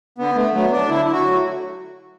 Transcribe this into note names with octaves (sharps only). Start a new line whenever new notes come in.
D3 B3
A3
F#3 A3 B3
D4
D3 E4
E4
F#4
F#3 A3